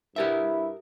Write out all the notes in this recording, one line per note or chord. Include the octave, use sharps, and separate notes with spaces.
G2 E4 G4 A#4 E5